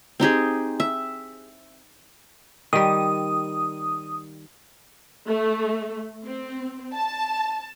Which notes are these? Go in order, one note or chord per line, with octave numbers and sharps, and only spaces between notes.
C4 D#4 G4 G#4
E5
D#3 G3 D#6
A3
C4
A5